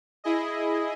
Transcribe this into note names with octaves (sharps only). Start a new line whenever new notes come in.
E4 G#4 D#5